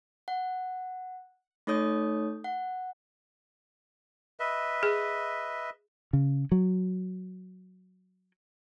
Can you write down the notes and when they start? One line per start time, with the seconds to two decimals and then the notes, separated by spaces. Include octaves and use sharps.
0.28 F#5
1.67 A3 D#4 A4 C#5 D#6 G6
2.44 F#5
4.40 B4 D#5 E5
4.83 G#4
6.13 C#3
6.52 F#3